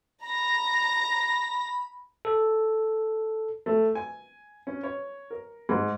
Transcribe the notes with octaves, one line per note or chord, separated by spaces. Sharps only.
A#5 B5 A#6
A4
A3
G#5
C#4
C#5
A#4
G#2